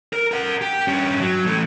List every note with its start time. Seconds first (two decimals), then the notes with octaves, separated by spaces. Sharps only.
0.13 A#4
0.32 A#4 F#5
0.62 G4
0.88 G2 C#4
1.21 F#3
1.47 E3 A3